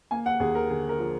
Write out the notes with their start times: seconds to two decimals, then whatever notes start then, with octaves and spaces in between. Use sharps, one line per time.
0.11 A#3 G#5
0.26 F#5
0.40 D#2 G#4
0.55 A#4
0.69 D3 G#4
0.89 A#4
0.99 F3